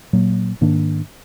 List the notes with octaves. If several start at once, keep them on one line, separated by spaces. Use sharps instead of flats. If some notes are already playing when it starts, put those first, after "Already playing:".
A#2 F#3 A#3
G#2 D#3 A#3 D4